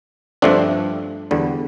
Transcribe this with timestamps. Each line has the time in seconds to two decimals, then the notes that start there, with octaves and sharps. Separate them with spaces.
0.42 G2 F3 A3 C4 D4
1.31 E2 D3 G3